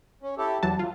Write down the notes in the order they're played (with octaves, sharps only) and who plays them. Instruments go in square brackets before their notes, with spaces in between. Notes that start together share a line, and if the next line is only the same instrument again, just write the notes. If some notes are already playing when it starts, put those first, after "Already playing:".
[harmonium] C#4
E4 G4 A4
[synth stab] E2 F#3 A5 [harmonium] D3
[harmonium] F#3 [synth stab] F4